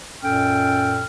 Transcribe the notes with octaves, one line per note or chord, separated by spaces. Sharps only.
F#2 A#2 C#4 A4 G5 F6